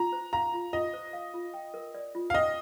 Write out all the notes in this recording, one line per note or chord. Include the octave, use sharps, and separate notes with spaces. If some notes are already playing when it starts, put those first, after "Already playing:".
Already playing: F4 A#5
C5
F5 A#5
F4
F4 D#5
C5
F5
F4
G5
A#4
D5
F4
F5
D#5 G5